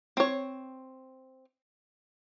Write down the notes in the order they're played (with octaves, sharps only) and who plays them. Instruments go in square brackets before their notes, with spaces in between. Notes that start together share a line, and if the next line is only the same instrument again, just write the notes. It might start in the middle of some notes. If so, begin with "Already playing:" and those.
[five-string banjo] C4 C#5